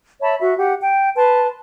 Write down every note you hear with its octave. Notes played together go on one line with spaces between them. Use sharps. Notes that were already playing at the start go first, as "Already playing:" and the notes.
C#5 E5 A5 B5
F#4 E5
G4 F#5
G5
B4 A5 C6